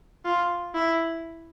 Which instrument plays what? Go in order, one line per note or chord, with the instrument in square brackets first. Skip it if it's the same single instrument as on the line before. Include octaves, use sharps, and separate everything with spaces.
[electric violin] F4
E4